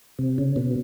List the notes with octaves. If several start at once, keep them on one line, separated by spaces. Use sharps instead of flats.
C3
C#3
B2